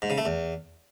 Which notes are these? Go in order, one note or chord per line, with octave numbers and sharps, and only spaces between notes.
G#2
C#3
A3
E2